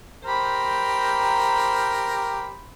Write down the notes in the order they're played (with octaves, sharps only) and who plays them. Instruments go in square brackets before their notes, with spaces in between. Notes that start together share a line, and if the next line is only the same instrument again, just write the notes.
[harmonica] G4 A#4 [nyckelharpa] C5 B5